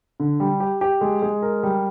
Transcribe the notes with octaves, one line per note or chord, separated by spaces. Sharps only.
D3
G3
G4
G4
G#3
G#3
A#4
G3